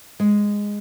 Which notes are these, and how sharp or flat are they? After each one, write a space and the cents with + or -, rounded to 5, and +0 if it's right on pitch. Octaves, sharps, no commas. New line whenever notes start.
G#3 -10